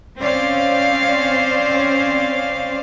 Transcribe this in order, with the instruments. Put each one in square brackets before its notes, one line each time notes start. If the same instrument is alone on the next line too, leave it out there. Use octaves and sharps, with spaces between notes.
[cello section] C4 C#4 C5 D5 F5